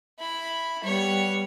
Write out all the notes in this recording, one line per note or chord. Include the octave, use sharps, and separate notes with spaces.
E4 B5
G3 B3 C#5